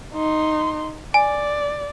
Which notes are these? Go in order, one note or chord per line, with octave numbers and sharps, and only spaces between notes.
D#4 C6
D5 G#5